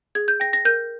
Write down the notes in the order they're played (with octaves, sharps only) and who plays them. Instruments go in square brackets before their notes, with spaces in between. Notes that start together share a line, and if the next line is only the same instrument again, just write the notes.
[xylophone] G#4 G#6
G6
G5 A#6
A#6
A#4 G6